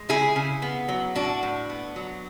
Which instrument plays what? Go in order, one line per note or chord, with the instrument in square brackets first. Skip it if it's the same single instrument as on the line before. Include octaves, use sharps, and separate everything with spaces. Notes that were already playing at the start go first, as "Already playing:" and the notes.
Already playing: [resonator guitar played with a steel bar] G#3
C#3 E4 G#4
C#3
B3
F#3
A2 D4 F#4
A2
B3
F#3